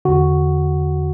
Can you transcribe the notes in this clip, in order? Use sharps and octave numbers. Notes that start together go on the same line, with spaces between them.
E2 D3 F#4